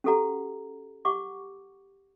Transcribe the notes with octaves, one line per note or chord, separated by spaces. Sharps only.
C#4 F#4 G4 A4 F#5 A#5
G4 F#5 C#6 D6